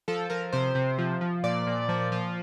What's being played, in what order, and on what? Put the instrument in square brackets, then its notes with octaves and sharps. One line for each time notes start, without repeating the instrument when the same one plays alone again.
[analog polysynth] F3 A4
F3 A#4
C3 C5
C3
F3
F3
A#2 D5
A#2
F3
F3